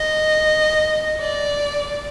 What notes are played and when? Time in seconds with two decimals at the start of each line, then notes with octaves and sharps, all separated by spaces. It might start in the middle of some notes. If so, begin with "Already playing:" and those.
Already playing: D#5
1.20 D5